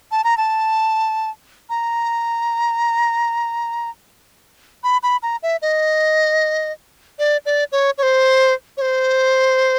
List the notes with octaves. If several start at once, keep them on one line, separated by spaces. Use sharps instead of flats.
A5
A#5
A5
A#5
B5
B5
A#5
E5
D#5
D5
D5
C#5
C#5
C5
C#5
C5